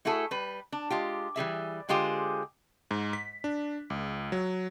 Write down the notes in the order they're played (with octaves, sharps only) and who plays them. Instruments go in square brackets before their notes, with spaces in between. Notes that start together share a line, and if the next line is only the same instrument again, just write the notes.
[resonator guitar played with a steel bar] A3 E4 F#4 G#4 A4
G3 B4
D4
G#3 F4 G4
E3 G3 G#4 E5
D3 G#3 F4 G4 G#4 C5
[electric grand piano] G#2
B6
D4
C#2
F#3